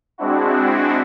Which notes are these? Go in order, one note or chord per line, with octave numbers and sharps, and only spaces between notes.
G#3 C4 D4 E4 F#4